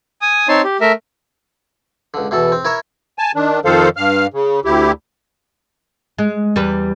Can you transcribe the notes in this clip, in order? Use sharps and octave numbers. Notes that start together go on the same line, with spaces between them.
G#5 D#6
C4 D#4 C#5 A5 C6
G4
A3 A#4 E5
C#2 D3
E2 B2 E3 A4
C4
E4 A#4 C#5 E5
G#5 A5
D#3 D4
F2 D#3 F3 A4 C5 F5
G2 F5 F6
C#3
D2 E4 G4
G#3
E2 G3 B4